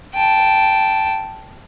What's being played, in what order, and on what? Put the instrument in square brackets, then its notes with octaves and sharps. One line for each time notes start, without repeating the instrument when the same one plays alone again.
[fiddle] G5 A5